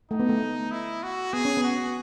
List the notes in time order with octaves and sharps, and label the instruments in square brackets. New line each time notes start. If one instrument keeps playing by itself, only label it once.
[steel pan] A3 [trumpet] D#4
[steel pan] B3
A3
[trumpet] E4
F#4
[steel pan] B3 [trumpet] G#4
[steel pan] C#4
B3
[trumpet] F#4